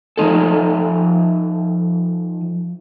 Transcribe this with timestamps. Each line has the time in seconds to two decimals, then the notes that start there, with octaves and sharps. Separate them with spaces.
0.17 F3 G3 D#4 A4